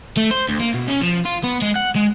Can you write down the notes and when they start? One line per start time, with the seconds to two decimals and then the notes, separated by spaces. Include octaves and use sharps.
0.17 A3
0.31 C5
0.49 D2
0.60 A#3
0.74 B2
0.88 C#4
1.03 F3
1.25 F4
1.44 B3
1.62 G#3
1.75 F#5
1.96 G#3